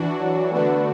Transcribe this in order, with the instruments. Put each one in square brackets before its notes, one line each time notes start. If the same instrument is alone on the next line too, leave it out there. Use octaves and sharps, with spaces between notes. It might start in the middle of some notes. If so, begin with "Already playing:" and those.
Already playing: [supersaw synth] E3 D4 F#4
[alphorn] F#3
[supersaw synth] D3 A3 D4 F#4 [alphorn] B3